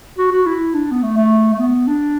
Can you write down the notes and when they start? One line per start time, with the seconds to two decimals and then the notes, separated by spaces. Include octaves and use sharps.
0.18 F#4
0.32 F#4
0.47 E4
0.74 D4
0.92 B3
1.03 A3
1.17 A3
1.54 A3
1.59 B3
1.88 D4